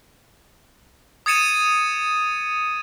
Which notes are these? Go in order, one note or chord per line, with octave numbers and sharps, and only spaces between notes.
D#6 G#6 A6 C#7 D#7 E7